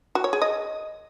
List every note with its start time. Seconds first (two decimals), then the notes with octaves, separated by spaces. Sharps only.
0.15 F#4
0.24 C#5
0.33 G#4
0.42 D#5